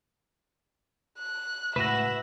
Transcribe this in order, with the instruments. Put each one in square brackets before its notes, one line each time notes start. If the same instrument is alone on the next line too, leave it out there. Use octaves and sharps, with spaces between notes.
[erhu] F#6
[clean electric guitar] C#2 A2 F#4 [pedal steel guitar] B4 F#5 [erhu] E5 [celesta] A#6 E7